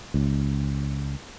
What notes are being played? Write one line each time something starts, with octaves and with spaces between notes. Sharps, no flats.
C#2